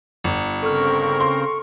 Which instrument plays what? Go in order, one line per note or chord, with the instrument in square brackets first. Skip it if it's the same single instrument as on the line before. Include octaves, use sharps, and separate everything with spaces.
[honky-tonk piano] G1
[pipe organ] C#3 C4 A#4 [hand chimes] A4 F6 [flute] C#6
[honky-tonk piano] C6